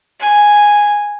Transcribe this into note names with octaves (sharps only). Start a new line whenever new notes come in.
G#5